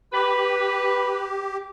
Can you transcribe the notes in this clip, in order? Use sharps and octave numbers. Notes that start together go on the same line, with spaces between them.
G4 B4